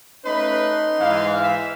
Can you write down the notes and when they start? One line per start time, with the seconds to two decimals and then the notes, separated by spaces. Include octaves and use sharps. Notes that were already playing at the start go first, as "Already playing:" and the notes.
0.25 A3 C#4 D#4 B4 C6
1.00 G#2 E3 F5
1.43 E5